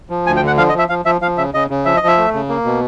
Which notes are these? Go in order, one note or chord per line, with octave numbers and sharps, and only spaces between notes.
F3
D2 G#5
G5
D3 F#5
F3 F5
D#5
F3
E5
F3 F5
F3 E5
F3 F5
C#3 E5
C#3 D#5
C#3
F3 E5
D#5
F3 E5
A3
C#3
A#3
B2